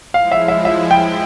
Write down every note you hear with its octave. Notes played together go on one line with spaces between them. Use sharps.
F3 G#3 E4 F5
E5
E5
E5
G5